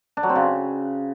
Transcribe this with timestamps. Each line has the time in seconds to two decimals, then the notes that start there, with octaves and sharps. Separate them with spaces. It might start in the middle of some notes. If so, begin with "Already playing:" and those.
0.17 D4
0.23 F#3
0.29 C4
0.36 C#3